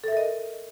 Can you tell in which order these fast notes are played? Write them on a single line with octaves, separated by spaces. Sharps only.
A4 E5 A#4 D#5